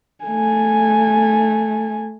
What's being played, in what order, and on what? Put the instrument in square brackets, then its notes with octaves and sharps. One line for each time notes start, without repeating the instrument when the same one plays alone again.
[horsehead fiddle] A3 G#5